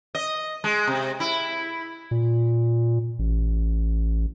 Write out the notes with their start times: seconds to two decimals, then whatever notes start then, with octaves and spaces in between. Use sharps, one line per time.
0.15 D#5
0.64 G#3
0.87 C3
1.20 E4
2.11 A#2
3.19 A1